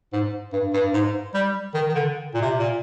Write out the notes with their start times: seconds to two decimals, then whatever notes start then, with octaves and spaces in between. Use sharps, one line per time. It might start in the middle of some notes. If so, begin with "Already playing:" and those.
0.13 G#2
0.53 G2
0.73 G2
0.93 G#2
1.35 G3
1.74 D#3
1.89 D#3
1.94 D3
2.34 A#2
2.42 C3
2.59 A#2